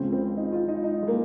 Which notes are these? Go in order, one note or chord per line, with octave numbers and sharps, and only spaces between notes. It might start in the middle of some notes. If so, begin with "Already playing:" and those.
Already playing: C#2 C#3 F3 C4
C4
D#4
F4
D#4
D#4
G#3
A#3